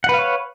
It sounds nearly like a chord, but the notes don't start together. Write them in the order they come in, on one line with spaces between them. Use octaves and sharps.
F#5 B4 F5 C#5